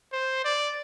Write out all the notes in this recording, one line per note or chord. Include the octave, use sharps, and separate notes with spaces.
C5
D5